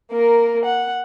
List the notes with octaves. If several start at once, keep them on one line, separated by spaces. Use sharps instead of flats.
A#3 A#4
F#5